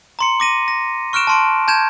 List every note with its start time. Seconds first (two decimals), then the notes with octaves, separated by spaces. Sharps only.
0.19 A#5 C6 C#7
0.40 D6 A#6 D#7
0.68 A#6
1.13 C#6 F6 F#6 D7 E7
1.27 A5 C6 D7
1.68 A5 G6 G#6 E7